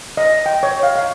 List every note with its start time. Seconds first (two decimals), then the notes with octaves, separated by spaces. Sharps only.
0.17 D#5
0.46 G5
0.63 C#5
0.83 F5
0.96 F5